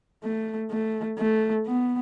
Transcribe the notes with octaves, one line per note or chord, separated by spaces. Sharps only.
A3
A3
A3
B3